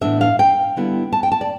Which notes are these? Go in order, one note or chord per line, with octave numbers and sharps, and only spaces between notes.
A2 E3 B3 D4 E5
F5
G5
D3 G3 B3 E4
A5
G5
A5
D5